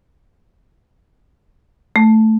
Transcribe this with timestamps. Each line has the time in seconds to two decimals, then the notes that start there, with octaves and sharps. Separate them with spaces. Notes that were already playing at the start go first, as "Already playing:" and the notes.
1.96 A3